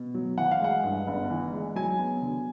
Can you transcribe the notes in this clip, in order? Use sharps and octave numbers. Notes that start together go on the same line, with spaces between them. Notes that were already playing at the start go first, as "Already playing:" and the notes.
Already playing: B2
F#3
E3 F#5
F5
G#3 F#5
G2
G1
E3
G#3
F#3 G#5
B3
D3